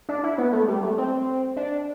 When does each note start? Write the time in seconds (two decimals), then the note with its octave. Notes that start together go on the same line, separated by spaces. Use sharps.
0.09 D4
0.23 E4
0.38 B3
0.52 A3
0.68 G3
0.83 A3
0.98 C4
1.56 D4